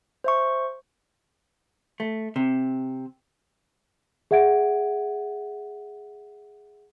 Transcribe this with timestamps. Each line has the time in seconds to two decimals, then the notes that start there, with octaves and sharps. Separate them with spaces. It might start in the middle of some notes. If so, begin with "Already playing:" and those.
0.24 C5 E5 C#6
2.00 A3
2.36 C3
4.31 G#4 E5 F#5 G#6 D7